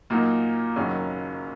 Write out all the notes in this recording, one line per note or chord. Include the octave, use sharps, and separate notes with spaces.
A#2 F#3 A#3 D#4
F#1 F#2 D#3 F#3 C#4